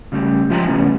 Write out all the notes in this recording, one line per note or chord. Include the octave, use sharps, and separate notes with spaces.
C#3 G3 A3 G4
G#2 F3 F4 E5 G5 A#5
C#3 F#3 G3 A3 B3 C#4